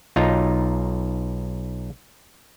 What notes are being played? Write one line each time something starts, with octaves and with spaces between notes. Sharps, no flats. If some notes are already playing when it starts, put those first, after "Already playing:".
B1 D#4 F4 A#5